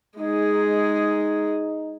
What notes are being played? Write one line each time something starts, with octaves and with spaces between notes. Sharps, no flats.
G#3 D#4 G#4